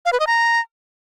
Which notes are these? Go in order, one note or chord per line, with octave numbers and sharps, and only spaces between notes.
F5
B4
D#5
A#5